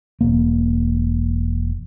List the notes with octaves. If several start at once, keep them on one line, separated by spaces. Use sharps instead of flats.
E1 A#3